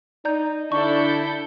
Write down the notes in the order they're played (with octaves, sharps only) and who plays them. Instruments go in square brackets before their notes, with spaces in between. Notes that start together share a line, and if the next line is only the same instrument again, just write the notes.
[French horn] D#4 [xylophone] D5 A#5 G6
[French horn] D3 [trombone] D4 [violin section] E4 A4 G6 [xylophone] C#6